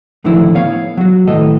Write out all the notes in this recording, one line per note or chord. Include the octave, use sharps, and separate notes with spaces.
A2 D3 D#3 F3 E4
B3 C#5 F5
F#3 F#4
A2 D#3 E3 A4 D#5